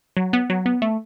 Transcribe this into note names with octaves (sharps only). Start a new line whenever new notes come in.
F#3
B3
F#3
B3
A3